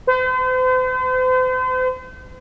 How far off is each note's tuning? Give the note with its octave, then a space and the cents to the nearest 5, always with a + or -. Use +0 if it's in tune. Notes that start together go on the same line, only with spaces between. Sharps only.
C5 -45